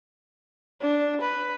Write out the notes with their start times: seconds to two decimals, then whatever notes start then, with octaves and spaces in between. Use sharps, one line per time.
0.81 D4
1.21 B4